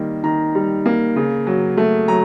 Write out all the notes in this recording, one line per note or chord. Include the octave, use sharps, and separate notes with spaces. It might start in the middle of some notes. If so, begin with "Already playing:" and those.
Already playing: D#3 G3 A#3
D#3 A#5
G3
A#3
C#3
F#3
A3
F#3 A#5